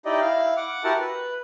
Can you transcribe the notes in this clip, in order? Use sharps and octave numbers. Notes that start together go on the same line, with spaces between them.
D#4 E4 G4 D5 D#5 G5
E4 F5
F#5 D6
E4 F#4 G4 A#4 F#5 A5
B4